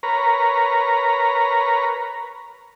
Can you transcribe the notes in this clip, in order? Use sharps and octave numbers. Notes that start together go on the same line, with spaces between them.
A#4 B4 C#5 A#5